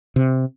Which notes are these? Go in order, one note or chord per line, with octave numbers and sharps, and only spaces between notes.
C3